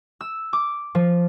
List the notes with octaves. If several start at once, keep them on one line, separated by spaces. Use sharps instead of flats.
E6
D6
F3